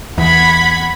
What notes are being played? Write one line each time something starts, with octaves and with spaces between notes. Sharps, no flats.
E2 F#5 B5 G#6